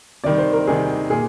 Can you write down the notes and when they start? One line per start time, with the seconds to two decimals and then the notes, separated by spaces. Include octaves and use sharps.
0.24 C3 D#3 G3 D5
0.38 C5
0.53 A#4
0.67 C3 D#3 G3 G#4
1.10 A#2 G#4